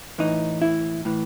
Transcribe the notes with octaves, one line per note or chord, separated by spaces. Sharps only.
A2 E3 D#4
E4
A2 E3